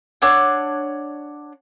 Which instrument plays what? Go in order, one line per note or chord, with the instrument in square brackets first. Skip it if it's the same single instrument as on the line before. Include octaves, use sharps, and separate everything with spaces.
[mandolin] D4 C#5 F#5 E6